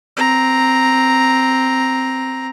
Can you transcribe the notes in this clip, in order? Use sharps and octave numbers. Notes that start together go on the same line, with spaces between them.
C4 A#5